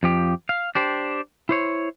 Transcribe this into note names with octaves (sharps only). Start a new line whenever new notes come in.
F2 F3 G4
F5
D4 G4 C5
E4 C5 C#5